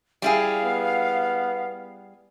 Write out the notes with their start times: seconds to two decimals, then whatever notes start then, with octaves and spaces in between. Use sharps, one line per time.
0.22 G3 E4 G#4 F5
0.64 B3